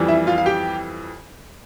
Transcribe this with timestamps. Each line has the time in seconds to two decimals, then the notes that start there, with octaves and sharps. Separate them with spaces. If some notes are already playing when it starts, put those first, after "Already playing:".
Already playing: F2 E3 G3
0.08 E4 E5
0.27 F4 F5
0.38 F5
0.46 G4 G5